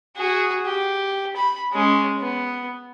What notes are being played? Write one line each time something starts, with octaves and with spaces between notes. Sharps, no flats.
F#4 G#4
G4
B5
G#3 C#4
B3